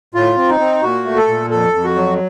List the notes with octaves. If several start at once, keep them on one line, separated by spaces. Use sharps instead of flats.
A2 F4
C4
D#4
C4
A#2 F#4
A3
A4
A#2
F2 A4
F2
F#4
F#3